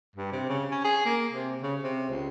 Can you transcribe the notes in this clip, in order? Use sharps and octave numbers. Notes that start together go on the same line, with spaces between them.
G2
C3
C#3
C#4
G#4
A#3
C3
C#3
C3
C#2